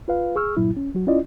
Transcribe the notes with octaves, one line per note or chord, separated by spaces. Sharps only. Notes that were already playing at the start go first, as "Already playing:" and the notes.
F4 B4 F5
G#4 C#6 E6 F6
G2 A#2 F#3 E4
C#4
F#3 F#4
C#4 E4 F4 D5 D#5